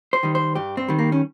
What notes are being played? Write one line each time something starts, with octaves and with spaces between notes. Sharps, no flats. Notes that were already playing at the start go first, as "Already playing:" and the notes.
C5
D#3 G3
C5
G2 G4
C4
D#3 G3
A#3
C#4